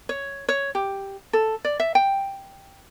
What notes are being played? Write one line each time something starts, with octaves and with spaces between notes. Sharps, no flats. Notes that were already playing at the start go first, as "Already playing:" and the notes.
C#5
C#5
G4
A4
D5
E5
G5